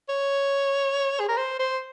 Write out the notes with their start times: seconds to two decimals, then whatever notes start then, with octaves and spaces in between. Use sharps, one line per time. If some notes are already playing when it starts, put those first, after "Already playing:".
0.09 C#5
1.19 G#4
1.29 A#4
1.37 C5
1.59 C5